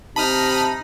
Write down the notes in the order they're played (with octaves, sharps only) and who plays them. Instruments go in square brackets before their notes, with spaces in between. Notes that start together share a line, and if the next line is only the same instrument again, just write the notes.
[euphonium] C3 [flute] D#4 [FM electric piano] A5 [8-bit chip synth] B5 D#6 F6